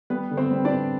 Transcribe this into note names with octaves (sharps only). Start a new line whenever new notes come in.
G3 B3 B4
D3
C4 C5
G3
D4 D5
B3